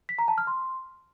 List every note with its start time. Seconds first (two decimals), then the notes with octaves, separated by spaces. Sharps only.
0.09 B6
0.19 A#5
0.28 A5
0.38 F6
0.47 C6